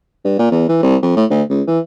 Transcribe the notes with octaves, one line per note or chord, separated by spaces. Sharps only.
G2
A#2
E2
E3
C2
F2
A2
D2
C#2
E3